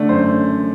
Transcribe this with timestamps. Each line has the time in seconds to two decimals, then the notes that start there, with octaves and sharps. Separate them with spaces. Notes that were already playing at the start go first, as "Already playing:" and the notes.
Already playing: D3 A3 D5
0.09 F#2 C5